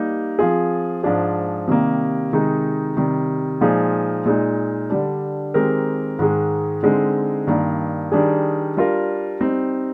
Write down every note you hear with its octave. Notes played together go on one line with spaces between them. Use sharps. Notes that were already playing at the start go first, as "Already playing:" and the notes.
Already playing: G3 A#3 D#4 G4
F3 C4 F4 G#4
G#2 F3 G#3 D4 G#4
C3 D#3 G3 A#3
C3 D#3 G#3 D#4
C3 D#3 G3
A#2 F3 G#3 D#4 G#4
A#2 G#3 D#4
D3 G3 D4
D#3 G#3 C4 G4 A#4
G#2 D#3 G#3
D3 G#3 C4 D#4
G2 D#3 A#3 D4
D#3 G3 D4 G#4
G3 D4 F4 A#4
G3 C4 D#4